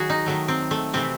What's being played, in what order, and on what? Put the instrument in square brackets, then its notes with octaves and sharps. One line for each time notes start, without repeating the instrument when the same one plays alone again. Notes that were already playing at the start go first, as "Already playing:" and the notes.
Already playing: [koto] D#3 F#3 F#4 G#4
D#4
D#3 F#3 A3
C4
A3
C3 E3 A3 C4